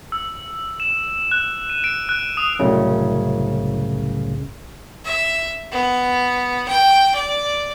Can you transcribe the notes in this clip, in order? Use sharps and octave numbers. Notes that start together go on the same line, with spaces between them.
E6
E7
F#6
D#7
D7
F#6
D#6
C2 F#2 A2 C#3
E5
B3
G5
D5